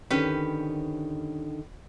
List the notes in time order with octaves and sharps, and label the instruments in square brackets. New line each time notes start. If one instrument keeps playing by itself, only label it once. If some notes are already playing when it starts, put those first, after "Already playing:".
[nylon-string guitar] D3 D#3 [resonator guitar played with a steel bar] C#4 G4 B4